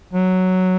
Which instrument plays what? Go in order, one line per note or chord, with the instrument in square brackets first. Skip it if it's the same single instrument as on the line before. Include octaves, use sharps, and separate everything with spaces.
[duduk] F#3